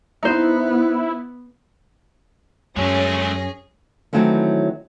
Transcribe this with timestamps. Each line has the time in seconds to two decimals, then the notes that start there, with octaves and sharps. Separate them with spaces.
0.23 B3 D#4 E4 C5
2.76 F#2 G#3 A3 C#4 G#4 A#6
4.13 D#3 E3 F#3 A3 C4 C#4